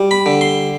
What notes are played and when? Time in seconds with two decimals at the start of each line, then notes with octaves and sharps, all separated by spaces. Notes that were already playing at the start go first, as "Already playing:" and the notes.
Already playing: G3
0.11 B5
0.26 D3
0.41 C6